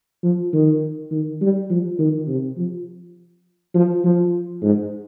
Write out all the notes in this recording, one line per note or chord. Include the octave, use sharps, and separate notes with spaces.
F3
D#3
D#3
G3
F3
D#3
C3
F3
F3
F3
G#2